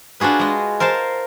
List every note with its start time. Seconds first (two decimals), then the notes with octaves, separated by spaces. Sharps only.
0.20 D4 F4 F#4 G#4 B4
0.39 G#3 D#5
0.80 A#4 C5 F5 A5